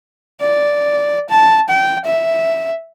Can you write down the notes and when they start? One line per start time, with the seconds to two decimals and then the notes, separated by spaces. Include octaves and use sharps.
0.41 D5
1.29 A5
1.69 G5
2.05 E5